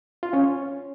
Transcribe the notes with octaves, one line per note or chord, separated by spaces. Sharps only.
F4
C#4
C#5